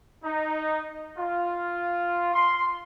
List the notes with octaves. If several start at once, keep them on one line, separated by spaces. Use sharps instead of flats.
D#4
F4
C6